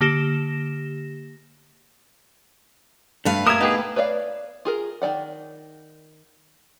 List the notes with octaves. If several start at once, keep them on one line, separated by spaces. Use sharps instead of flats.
D3 A#3 G4 A#6 E7
G2 A3 B4 F5
A#3 A#4 E5 D#6 G#6
B3 D#4 G4 G#4
B4 C#5 D5 E5 F5
F4 G#4 A#4
D#3 C#4 D5 F#5